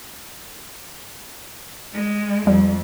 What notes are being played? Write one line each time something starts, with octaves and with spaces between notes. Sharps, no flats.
G#3
F2 G3